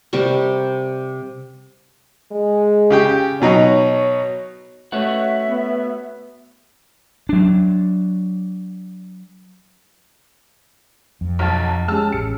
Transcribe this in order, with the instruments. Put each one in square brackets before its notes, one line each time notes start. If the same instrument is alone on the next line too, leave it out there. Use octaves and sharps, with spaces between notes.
[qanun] C3 G3 A#4 C#6
[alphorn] G#3
[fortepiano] C#3 G4 G5
[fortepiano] B2 F#3 D#4 [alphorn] C#5
[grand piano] A3 C#4 [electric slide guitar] F#4 B4 F#5 [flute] E5
[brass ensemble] B3
[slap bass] F#3 D4
[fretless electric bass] F2
[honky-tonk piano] B1 F#3 [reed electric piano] A5 F6
[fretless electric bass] G#3 [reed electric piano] C#4 G4 G#4 [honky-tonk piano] A5 E6 F6
[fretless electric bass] A1 [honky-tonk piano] C#7